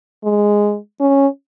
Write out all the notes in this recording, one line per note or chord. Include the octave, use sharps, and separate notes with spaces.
G#3
C#4